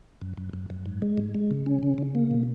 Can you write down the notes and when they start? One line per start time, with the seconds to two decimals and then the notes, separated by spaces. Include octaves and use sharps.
0.22 F#2
0.37 F#2
0.53 F#2
0.70 F#2
0.86 G#2
1.02 G#3
1.18 G#2
1.34 G#3
1.51 C#3
1.66 C#4
1.83 C#3
1.98 C#3
2.15 A#3
2.31 B2